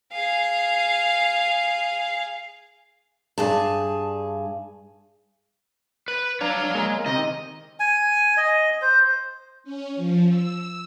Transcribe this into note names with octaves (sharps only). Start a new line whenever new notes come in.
G#4 F5
G2 G#4 A5
B4
D4 C#5 F5 A#5
G#3 A#3
C3 D#3 D#5
G#5
D#5
C5
C#4
F3
E6